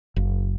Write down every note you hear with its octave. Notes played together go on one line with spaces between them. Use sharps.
F#1